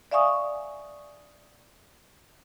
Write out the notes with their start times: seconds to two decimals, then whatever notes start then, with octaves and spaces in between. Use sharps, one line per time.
0.11 D5 E5 F5 G#5 C#6 D#6